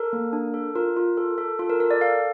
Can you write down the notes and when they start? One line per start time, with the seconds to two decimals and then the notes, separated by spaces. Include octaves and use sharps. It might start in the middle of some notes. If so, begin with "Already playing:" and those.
Already playing: A4 A#4
0.13 A#3
0.33 D4
0.54 A4
0.75 F4 A#4
0.97 F4
1.17 A4
1.38 A4
1.59 F4 A4
1.70 A#4
1.80 A4 A#4
1.91 D5
2.01 A4 F5